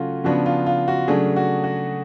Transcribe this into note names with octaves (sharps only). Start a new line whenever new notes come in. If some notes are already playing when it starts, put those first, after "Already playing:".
Already playing: C#3 F#3 A3 C#4 F4 F#4
C#3 F3 B3 D4 F#4
F4
F4
F#4
C#3 F#3 A3 D4 G#4
F#4
F#4